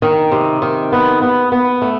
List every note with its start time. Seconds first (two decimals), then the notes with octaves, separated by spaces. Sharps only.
0.02 D#3
0.32 C3
0.62 D#3
0.92 B3
1.22 B3
1.52 B3
1.82 A3